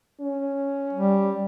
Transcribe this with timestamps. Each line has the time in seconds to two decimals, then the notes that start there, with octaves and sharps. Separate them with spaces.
0.21 C#4
0.93 G3